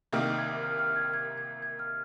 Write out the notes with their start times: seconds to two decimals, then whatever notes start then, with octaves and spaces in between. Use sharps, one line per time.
0.13 C2 C3 D#3 A#3 F6
0.38 G#6
0.63 F6
0.79 F6
0.96 G#6
1.14 G#6
1.37 G#6
1.62 G#6
1.79 F6